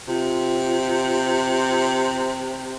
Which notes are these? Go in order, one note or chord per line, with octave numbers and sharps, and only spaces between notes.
C3 F4